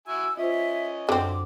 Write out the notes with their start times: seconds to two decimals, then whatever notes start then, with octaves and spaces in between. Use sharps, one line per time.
0.08 E4 F#4 G#5 E6
0.37 C#4 F4 C5 D#5 E5
1.09 F#2 D3 C4 D6